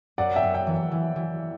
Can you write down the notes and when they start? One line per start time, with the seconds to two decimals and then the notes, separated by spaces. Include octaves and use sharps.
0.18 F#2 D5 F#5
0.36 E5 G5
0.43 F#2
0.54 E5 G5
0.67 E3
0.91 E3
1.16 E3